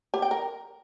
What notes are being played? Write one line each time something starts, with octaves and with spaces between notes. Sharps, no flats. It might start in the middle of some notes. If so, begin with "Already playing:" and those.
G4
G5
A#4